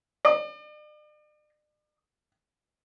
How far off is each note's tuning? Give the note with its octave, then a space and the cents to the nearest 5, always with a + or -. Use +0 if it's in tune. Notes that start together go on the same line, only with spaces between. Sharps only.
D5 +45